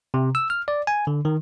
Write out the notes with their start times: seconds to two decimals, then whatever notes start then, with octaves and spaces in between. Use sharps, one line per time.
0.14 C3
0.35 E6
0.50 F6
0.68 D5
0.87 G#5
1.07 D3
1.25 D#3